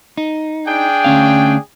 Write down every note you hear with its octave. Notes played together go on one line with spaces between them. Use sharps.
D#4
D4 G#4 G5
D2 C#4 F5